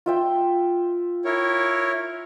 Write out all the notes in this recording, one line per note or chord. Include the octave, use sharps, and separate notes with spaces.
F4 E5 G5
E4 A#4 C#5